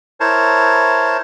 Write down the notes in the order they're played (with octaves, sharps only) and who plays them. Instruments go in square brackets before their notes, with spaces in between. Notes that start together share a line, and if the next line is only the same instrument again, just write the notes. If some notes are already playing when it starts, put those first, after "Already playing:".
[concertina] E4 A#4 C5 C#5 A5